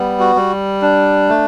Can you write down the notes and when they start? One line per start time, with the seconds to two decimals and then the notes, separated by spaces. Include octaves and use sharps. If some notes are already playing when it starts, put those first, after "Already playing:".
Already playing: G3 B3
0.20 F#4
0.36 G3
0.82 D4
1.29 A3